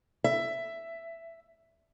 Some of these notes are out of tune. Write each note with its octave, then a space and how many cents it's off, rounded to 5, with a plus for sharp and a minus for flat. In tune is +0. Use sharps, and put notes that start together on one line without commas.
E5 +10